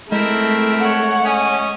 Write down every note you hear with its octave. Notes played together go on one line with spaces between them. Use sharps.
G#3 A3 C4 E4 A#4
C#5 F#5
C#4 D#5